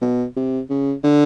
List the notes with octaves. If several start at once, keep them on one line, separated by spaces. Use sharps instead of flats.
B2
C3
C#3
D3